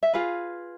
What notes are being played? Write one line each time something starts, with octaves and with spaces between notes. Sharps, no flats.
E5
F4 G#4 B4 F5